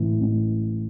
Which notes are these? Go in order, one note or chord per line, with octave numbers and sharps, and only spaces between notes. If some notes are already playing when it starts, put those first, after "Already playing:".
Already playing: A1 A2 E3
A1